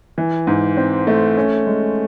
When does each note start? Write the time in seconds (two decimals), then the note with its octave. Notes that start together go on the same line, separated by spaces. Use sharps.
0.18 E3
0.47 G#2
0.77 C4
1.07 A3
1.37 C#4
1.67 G#3